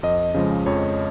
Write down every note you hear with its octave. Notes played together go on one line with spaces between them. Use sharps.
F2 D#5
C#3 F3 G#3
F2 C#5